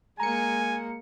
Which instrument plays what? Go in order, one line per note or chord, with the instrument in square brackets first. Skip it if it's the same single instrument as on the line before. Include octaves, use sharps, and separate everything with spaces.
[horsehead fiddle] G#3 A#3 [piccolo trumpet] G#5 [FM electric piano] A#5 C#7